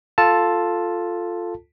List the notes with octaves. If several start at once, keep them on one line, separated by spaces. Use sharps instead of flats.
F4 A4 A5